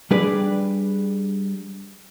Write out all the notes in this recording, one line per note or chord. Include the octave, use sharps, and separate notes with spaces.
G3 D4 G#4 B4 D5